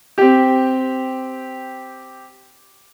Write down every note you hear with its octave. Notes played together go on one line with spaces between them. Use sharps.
C4 G4